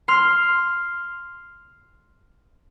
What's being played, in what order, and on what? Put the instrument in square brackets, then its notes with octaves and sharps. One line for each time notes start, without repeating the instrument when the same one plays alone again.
[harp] C6 F6